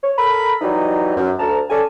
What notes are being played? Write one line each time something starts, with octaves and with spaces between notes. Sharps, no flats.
C#5
A4 A#4 A#5 B5
E3 F#3 G3 D#4
F#2
D2 A5 A#5
C#4 A4 D5 G#5